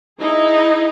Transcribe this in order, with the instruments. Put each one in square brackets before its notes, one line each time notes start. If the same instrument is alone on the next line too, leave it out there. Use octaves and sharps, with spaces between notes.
[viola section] D#4 E4 G#4